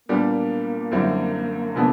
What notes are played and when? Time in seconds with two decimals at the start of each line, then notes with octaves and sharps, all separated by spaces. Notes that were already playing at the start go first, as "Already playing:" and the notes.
0.09 A#2 G3 A#3 B3 D4
0.91 F#2 D3 G3 C4 E4
1.75 C3 F3 G#3 B3 D4